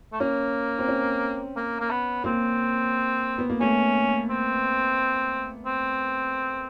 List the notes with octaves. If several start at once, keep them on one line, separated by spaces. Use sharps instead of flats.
A3
A#3 C#4
C4
C#4
A#3
A#3
B3
A#3 C4
B3
A#3
A3 C#4
C4
C4